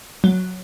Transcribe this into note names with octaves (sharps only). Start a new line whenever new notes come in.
F#3